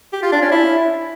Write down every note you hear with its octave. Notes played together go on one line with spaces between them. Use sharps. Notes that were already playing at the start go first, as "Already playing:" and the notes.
G4
F4
D4
C#4
E4